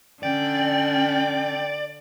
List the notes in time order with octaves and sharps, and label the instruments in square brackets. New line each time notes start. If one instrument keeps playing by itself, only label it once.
[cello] D3 [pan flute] C#4 [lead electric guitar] D5 [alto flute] G5